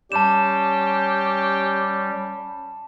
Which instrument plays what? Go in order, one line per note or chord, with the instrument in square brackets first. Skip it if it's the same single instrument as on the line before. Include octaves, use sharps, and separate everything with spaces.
[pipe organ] G3 [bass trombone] C#4 [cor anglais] G4 [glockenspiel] A5 E7